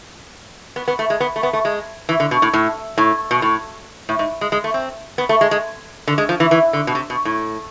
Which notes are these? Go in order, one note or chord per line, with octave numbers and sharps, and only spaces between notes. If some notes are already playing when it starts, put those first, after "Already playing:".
B3
B3
A3
G#3
B3
A3
B3
A3
G#3
E3
D3
B2
A2
A2
A2
B2
A2
A2
G#2
G#3
G#3
A3
C4
B3
A3
G#3
G#3
D3
G#3
F3
E3
E3
D3
B2
C3
B2
A2